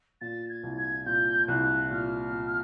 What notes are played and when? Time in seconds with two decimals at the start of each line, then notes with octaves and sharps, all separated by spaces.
0.21 A#2 A6
0.49 G#6
0.63 C2
0.77 G#6
1.06 A#2 G6
1.48 C2 F#6
1.91 A#2 F6
2.32 A#2